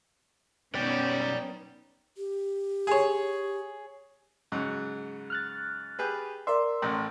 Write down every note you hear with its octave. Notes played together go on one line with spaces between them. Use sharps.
F#2 B2 B3 C#4 D#4 D5 G5
G4
G#4 C#5
G#2 C#3 F#3
F6 F#6 A6
G4 G#4 B4
A#4 D5 E5 C6
A1 A2